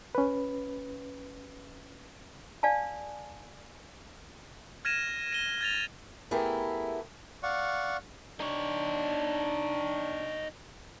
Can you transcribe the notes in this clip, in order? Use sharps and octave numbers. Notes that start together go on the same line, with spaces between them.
C#4 B4
D5 F5 G#5 A5
F6 G#6 A#6 D#7 E7
A#6 D#7 E7 G7
G#6 A6 F7
A3 B3 E4 G4 G#4 A#4
D5 F5 F#5 C#6
D4 D#4 C#5